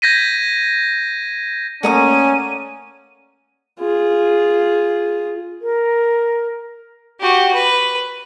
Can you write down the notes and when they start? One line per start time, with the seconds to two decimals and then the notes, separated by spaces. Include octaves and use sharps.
0.02 G6 G#6 A#6 B6 D#7
1.83 A3 A#3 C#4 D5 F#5 A#5 D#6 D#7
3.80 F4 G#4
5.61 A#4
7.20 F#4 G4
7.54 B4